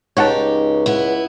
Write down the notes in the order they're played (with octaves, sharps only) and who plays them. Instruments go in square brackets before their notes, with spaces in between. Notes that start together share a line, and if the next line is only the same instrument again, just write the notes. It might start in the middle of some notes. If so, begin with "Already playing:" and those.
[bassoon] C#2 [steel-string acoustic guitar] D#4 G4 [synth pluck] C#5 F#5 A5
[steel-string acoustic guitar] B3 E4